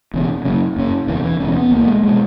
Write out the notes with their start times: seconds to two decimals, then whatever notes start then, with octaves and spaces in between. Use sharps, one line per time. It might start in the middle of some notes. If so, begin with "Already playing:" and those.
0.14 E1 E2 C#3
0.45 F#1 F#2 C#3
0.76 F#1 F#2 C#3
1.08 E1 E2 C#3 E3
1.24 E3
1.40 E1 E2 C#3 C#4
1.56 B3
1.71 C#2 B2 A#3
1.87 G#3
2.04 B2 G#3